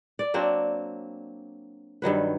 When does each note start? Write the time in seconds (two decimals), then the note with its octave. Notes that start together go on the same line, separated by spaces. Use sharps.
0.19 D5
0.34 F#3 A#3 C4 D4
2.02 G2 D#3 F#3 B4